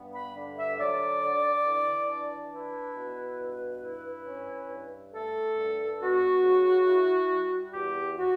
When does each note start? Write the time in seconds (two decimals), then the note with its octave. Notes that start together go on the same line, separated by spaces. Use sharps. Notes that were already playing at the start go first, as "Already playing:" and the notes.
Already playing: G2 B3
0.13 B5
0.35 D3
0.57 E5
0.78 F#3 D5
1.21 D3
1.64 E3
2.08 D4
2.51 E4 B4
2.94 B2
3.38 G2
3.82 E4
4.25 C#4
4.69 G2
5.13 A3 A4
5.56 G2
6.00 B3 F#4
6.43 C#3
6.85 E4
7.30 G3
7.72 E2 G4
8.17 F#4